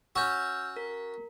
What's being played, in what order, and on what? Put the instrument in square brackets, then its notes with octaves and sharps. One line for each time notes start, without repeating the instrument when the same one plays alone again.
[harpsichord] C#4 F#4 [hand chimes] E6 F6 G6
[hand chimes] A#4